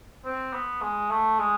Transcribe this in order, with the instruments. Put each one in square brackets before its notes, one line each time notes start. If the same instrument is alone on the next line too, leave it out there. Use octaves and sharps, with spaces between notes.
[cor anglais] C4
B3
G#3
A3
G#3